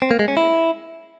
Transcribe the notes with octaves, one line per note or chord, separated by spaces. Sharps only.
C4
A#3
G#3
C#4
E4